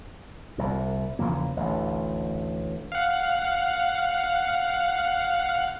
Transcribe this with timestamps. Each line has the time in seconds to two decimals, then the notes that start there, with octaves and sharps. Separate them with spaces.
0.58 C2 A#2
1.19 E2 C#3 F3 A#3
1.57 A1 D2
2.92 F5 F#5